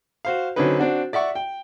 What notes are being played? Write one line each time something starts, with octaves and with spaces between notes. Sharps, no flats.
F#4 C5 F5
D3 F#3 C4 C#4 D#4 B4
C4 D4 F#4
D5 E5 F#5 C#6
G5